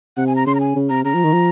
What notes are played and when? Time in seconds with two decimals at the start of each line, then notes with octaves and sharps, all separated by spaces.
0.17 C3 F#5
0.27 G#5
0.36 A#5
0.47 C#3 C6
0.55 A#5
0.60 G#5
0.76 C#3
0.89 C3 A#5
1.04 C#3 A#5
1.14 F3
1.24 D#3
1.33 F3